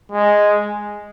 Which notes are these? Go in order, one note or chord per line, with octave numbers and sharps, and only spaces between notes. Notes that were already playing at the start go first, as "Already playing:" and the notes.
G#3